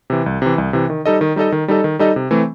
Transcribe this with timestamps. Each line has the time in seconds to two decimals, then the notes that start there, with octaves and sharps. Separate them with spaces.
0.10 C3 E3
0.26 C2
0.42 C3 E3
0.58 C2
0.73 C3 E3
0.90 D#3
1.06 G3 D#4 A4 D#5
1.21 D#3
1.36 G3 D#4 A4 D#5
1.52 D#3
1.68 G3 D#4 A4 D#5
1.84 D#3
1.99 G3 D#4 A4 D#5
2.16 C3
2.31 E3 A3 C4